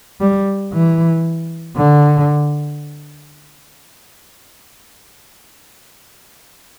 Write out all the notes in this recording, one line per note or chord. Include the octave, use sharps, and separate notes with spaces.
G3
E3
D3